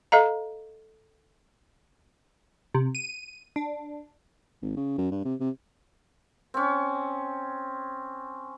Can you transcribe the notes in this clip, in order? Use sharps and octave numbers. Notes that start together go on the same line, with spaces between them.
A4 D#5 F5 A#5
C3
D#7
D4
G#1
C#3
F#2
G2
C3
C3
C4 C#4